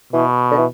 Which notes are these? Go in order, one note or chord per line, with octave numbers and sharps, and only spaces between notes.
B2 E3
D3
E3